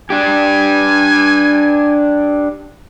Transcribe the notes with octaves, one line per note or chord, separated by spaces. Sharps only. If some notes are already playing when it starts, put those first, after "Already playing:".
D4 G4 G#5